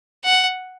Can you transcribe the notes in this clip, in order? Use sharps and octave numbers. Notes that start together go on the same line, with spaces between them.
F#5